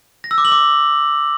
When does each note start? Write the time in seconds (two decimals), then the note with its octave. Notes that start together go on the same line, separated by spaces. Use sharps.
0.24 A#6
0.31 E6
0.38 D6
0.45 F#7
0.52 D6